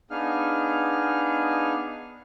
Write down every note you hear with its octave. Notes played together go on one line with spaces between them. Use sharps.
B3 D4 D#4 G#4 F5 F6